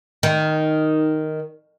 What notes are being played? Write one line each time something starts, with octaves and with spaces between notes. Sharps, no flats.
D#3